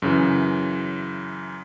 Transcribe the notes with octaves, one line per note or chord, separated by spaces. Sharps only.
F#2 C#3 E3